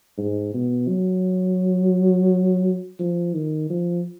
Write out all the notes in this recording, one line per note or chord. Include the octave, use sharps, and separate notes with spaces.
G#2
B2
F#3
F3
D#3
F3